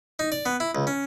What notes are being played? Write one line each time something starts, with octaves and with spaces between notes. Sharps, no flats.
D#4
D5
B3
E4
C#2
C#4